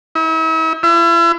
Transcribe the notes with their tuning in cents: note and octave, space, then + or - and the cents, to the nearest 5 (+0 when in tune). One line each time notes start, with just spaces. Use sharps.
E4 -40
E4 +40